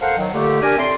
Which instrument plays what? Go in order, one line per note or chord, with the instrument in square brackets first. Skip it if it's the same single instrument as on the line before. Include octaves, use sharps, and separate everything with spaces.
[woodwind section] A4 A#4 C5 F5 F#5
D#3 F#3
A#2 D3 A3 G4
D4 G4 A#4 G#5
A2 A3 C4 D5 C6